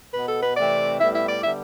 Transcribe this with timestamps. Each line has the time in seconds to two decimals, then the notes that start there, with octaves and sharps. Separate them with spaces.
0.14 B2 B3 B4
0.28 A4
0.42 B4
0.57 C3 E3 A3 C4 D5
1.00 A2 G3 B3 E5
1.14 E5
1.28 D5
1.43 D3 G3 B3 E5